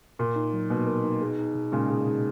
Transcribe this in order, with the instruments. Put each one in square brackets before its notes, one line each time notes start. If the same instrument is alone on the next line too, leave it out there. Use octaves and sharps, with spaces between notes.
[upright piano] A#2 [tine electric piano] A#4
[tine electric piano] D#4
F#3
[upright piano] B2 [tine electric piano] A#3
[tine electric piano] A#4
D#4
G#4
D#4
B2
[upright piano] A#2 C#3 [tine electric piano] G#3
[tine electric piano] G#4
D#4